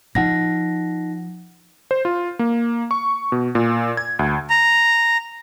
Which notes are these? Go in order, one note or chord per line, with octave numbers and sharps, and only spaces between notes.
F3 D#4 F#5 A#6
C5
F4
A#3
C#6
B2
A#2
G#6
D2
A#5